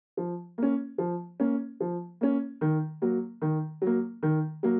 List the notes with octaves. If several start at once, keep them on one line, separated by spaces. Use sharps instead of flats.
F3
A#3 C#4
F3
A#3 C#4
F3
A#3 C#4
D#3
F#3 A#3
D#3
F#3 A#3
D#3
F#3 A#3